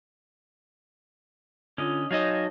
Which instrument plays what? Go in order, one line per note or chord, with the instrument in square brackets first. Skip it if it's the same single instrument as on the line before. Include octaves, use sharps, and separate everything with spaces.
[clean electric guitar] D3 [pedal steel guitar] C#4 D#5 [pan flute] F4
[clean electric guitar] F#3 D#4 D#5 [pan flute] C#5 [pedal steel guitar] F5 G#5 A5